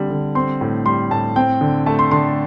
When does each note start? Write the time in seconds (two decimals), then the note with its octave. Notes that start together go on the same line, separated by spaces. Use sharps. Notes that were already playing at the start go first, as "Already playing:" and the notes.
Already playing: D3 G3 C4
0.10 D3
0.35 C4 C6
0.61 A2
0.86 G3 C6
1.11 A2 A5
1.36 C4 G5
1.61 D3
1.86 A3 A5
1.99 C6
2.11 D3 C6